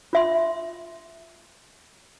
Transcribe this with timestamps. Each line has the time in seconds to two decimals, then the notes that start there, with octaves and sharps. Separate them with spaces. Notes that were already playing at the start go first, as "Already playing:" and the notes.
0.13 F4 E5 C6